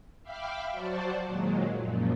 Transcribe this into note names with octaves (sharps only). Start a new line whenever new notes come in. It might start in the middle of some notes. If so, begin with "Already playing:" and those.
E5 F5 G5 B5 D6 F6
F#3 F#4 C5 D5 A5
A#2 D#3 F#3 G#3
F#2 A#2 F3